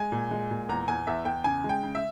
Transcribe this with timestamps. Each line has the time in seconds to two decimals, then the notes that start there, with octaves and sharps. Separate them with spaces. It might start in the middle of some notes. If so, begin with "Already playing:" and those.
Already playing: G#3 G#5
0.12 A#2
0.31 G#3
0.51 A#2
0.69 E2 A#5
0.88 E2 G#5
1.07 E2 E5
1.25 E2 G5
1.44 C#3 G#5
1.64 G#3
1.69 G5
1.83 C#3
1.95 E5